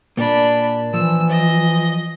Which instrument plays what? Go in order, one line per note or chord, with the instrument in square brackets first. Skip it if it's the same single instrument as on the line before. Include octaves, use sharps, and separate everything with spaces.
[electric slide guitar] A#2 A#3 [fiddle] D4 B5
[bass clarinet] E3 [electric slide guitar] F3 [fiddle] E6
[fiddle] D#5